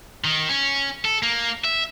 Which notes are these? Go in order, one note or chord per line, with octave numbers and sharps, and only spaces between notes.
D#3
C#4
A4
A#3
E5